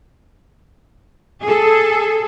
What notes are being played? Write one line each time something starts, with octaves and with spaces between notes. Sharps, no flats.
G#4 A4